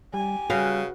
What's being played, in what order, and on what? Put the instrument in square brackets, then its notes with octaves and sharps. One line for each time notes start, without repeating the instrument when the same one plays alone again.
[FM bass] G3 [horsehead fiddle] G4 G#5
[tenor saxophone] C#3 [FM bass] G3 [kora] F#4 B4 F5